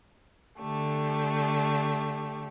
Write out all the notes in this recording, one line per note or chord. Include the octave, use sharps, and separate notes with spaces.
D3 A3 G4